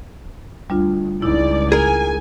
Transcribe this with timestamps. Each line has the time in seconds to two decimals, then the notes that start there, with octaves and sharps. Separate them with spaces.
0.70 D2 G3 D4 F4
1.22 C#2 D#4 E4 D5
1.72 G#4 A#4 G#5